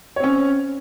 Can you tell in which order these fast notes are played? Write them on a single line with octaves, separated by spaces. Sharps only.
C#5 C4 C#4